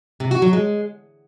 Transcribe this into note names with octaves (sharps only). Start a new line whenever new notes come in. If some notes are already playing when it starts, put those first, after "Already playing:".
C3
F#4
F#3
G#3